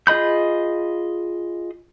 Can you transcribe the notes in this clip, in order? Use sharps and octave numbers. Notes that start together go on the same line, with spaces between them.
F4 G#4 D#5 B5 G6